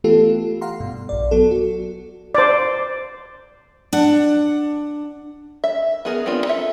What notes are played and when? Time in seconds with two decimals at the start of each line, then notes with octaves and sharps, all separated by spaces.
0.04 E3 A3 B3 F4 G4 A4
0.61 F5 F#5 A#5 C6
0.80 G2 B2
1.09 A#1 D5
1.31 F#3 B3 A4
1.51 F#4
2.35 C5 D5
3.93 D4 F#5
5.64 E5
6.05 B3 G#4 A#4
6.26 B3 C4 D4 F4
6.45 A4 E5